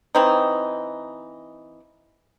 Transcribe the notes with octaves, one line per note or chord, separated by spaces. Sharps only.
E3 C4 D#4